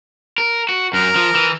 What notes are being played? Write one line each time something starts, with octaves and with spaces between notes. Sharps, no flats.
A#4
F#4
F#2 A#4
F3
E3